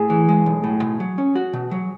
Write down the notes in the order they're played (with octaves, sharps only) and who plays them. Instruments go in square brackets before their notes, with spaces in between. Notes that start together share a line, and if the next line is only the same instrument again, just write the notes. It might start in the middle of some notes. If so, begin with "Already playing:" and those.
Already playing: [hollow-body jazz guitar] A2 [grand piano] G#4
[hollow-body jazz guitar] E3
G#3
B1
A2
B2
F#3
C#4
F#4
B2
F#3